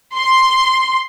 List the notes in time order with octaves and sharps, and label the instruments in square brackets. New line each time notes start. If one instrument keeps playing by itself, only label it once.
[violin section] C6